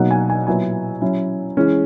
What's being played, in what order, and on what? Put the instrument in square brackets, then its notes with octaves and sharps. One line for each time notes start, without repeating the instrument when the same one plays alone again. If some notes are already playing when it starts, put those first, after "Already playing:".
Already playing: [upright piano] B2 F#3 A#3 D#4 F#5
G#5
G#5
A#2 F#3 B3 E4 G#5
F#3 C#4 E4
E3 G#3 C#4